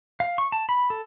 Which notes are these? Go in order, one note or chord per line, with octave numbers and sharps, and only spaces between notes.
F5
C#6
A5
B5
A4